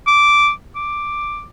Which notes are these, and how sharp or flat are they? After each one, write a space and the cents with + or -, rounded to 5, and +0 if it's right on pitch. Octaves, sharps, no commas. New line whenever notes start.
D6 -5
D6 +5